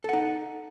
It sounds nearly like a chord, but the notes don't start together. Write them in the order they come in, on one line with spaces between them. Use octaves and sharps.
A4 F#5 D#4